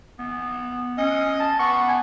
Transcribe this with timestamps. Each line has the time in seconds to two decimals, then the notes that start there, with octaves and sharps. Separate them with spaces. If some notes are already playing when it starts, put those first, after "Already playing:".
0.19 B3
0.98 C#4 D#5
1.39 A5
1.59 B3 C#6
1.88 G#5